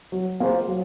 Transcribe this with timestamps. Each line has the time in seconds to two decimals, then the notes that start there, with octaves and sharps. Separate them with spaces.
0.12 F#3
0.40 A#3 F4 G#4 C5
0.68 F#3